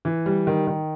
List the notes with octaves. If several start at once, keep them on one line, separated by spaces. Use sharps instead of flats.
E3
G3
D#3
D#3